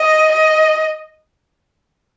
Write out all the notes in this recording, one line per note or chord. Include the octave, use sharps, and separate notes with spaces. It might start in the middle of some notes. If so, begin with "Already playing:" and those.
Already playing: D#5
D#5